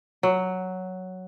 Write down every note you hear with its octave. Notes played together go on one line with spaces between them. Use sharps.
F#3